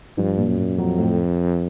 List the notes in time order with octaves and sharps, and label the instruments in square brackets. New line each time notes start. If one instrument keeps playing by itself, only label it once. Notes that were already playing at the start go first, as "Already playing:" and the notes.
[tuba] G2 [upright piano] F3
[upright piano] A#2
[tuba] F#2
[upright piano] A#2
[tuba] F2 [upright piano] F#3
[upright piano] A2